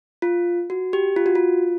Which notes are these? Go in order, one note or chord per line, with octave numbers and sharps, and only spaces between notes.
F4
F#4
G4
F4
F#4
F4